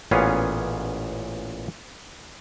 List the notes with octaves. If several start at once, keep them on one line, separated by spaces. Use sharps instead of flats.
A1 A#2 B3 C#4 G#4 F5